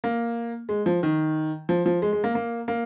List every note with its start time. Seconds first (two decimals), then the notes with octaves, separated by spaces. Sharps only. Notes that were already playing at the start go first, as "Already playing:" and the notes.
0.04 A#3
0.69 G#3
0.86 F3
1.03 D#3
1.69 F3
1.86 F3
2.02 G#3
2.13 G#3
2.24 A#3
2.35 A#3
2.68 A#3